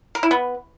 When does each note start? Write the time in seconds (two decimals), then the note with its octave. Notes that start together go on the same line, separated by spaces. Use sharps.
0.15 A#4
0.23 E4
0.31 B3